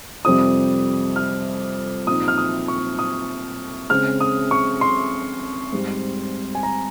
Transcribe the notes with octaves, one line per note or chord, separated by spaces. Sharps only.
F2 C3 G3 D#6
F6
A#2 F3 C4 D#4 D#6
F6
D#6
C#6
D#6
C#3 G#3 C4 F6
D#6
C#6
C6
G#2 G3 C4
G#5
A#5